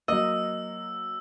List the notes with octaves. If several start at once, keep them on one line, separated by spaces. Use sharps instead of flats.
F#3 A#3 D#5 E6